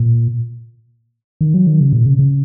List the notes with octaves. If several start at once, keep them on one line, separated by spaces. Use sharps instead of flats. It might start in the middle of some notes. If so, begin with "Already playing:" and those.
Already playing: A#2
D#3
F#3
D#3
C#3
A#2
C#3
C#3